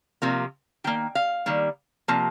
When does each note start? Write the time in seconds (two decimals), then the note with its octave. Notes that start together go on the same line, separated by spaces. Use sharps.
0.22 C3 F3 A#3
0.84 D#3 A#3 G5
1.15 F5
1.46 D#3 G3 A#3
2.08 C3 F3 A#3